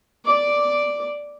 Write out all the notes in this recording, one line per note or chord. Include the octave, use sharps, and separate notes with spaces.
D5 D6